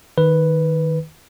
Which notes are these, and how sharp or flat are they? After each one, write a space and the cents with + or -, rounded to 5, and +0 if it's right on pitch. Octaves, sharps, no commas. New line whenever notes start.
D#3 +0 B4 +0